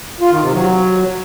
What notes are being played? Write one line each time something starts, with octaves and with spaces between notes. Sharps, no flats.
F4
D#3
C3
F#3